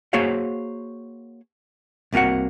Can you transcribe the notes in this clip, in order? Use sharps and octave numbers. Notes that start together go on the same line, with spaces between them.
A#3 F#4 G#4 C5 C#5 F5
C2 C3 A#3 F#4 F#5